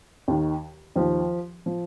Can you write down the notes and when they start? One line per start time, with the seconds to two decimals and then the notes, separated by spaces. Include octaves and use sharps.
0.28 D#2 D#3
0.95 D#2 D#3 F3
1.66 F3